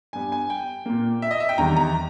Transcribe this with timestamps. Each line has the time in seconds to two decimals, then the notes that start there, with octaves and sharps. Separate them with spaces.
0.13 G2 G3 B3 G#5
0.32 G#5
0.50 G5
0.86 A#2 A#3
1.22 E5
1.31 D#5
1.40 E5
1.49 G5
1.58 E2 D#3 G3 A#5
1.77 A#5